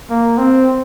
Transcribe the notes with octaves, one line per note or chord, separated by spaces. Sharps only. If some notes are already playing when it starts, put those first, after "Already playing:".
A#3
C4